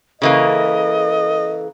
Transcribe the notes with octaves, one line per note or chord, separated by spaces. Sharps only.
C#3 E3 A#3 A4 D#5